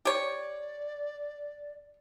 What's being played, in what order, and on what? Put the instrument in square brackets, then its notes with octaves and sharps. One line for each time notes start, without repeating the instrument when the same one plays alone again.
[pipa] G4 C#5 [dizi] D5